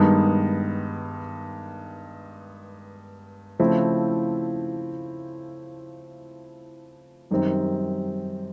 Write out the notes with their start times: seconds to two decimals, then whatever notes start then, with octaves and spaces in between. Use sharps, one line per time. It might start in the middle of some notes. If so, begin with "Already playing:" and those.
Already playing: G2 D#3 G#3 B3
3.59 C#3 F3 A3 C4 E4
7.31 F#2 D#3 G3 C4